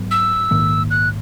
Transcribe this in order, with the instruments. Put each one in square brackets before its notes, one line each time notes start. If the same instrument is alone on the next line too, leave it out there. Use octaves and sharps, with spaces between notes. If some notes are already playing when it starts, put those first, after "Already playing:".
Already playing: [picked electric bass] G#2 F#3 B3
[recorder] E6
[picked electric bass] A#1 G#2 D#3 A#3
[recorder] F#6